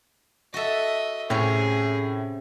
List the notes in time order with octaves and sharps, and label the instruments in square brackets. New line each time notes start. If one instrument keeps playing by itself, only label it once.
[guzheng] F#4 A4 [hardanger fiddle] D#5 E5
[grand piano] A2 [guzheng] C3 C#4 [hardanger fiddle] G#4